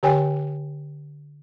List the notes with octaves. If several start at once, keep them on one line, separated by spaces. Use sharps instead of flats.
D3 G4 C#5 G5 G#5